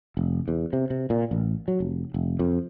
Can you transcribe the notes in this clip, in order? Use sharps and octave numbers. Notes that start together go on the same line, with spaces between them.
F1
E2
C3
C3
A#2
A1
F#3
F1
F1
F2